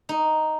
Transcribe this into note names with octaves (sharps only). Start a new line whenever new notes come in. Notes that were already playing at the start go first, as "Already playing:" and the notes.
D#4